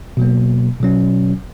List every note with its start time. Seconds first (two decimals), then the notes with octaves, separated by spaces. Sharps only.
0.17 B2 F#3 A#3
0.80 B2 F#3 C#4